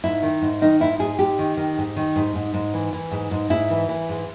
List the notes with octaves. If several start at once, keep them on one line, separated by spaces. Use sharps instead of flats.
G#2 E4
D#3
G#2
D#3 D#4
G#2 E4
G#2 G#4
G#2 G4
D#3
D#3
G#2
D#3
G#2
G#2
G#2
E3
E3
G#2
G#2
G#2 E4
E3
E3
G#2